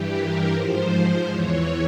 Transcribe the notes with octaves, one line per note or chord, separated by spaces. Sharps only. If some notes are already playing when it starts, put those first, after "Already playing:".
Already playing: G2 E3 G4
A#4
G#2 F3 C5
E2 E3 C#5